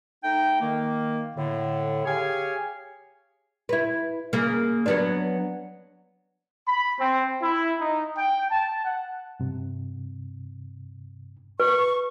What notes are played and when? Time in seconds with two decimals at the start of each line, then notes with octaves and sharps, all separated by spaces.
0.23 A3 D#4 G5
0.61 D#3 A#3
1.35 A2 D3
2.05 G4 G#4 C#5 F5 G#5
3.69 E4 B4
4.33 C#3 A#3
4.86 F#3 B3 D4
6.67 B5
7.00 C4
7.43 E4
7.81 D#4
8.18 G5
8.51 A5
8.84 F#5
9.40 G2 C3
11.60 B4 C#6